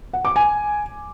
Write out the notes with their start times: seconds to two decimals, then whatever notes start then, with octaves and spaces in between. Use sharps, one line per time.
0.13 F#5
0.25 D6
0.36 G#5